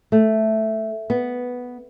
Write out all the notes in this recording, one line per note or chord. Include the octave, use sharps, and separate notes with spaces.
A3
B3